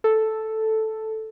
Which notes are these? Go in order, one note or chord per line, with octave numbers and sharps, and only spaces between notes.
A4